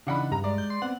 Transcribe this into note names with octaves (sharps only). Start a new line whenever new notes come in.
C#3 E3 D4 D#4 F#5 B5
G2 A#5
G#3 D5
G6
C6
B3 C4 F#5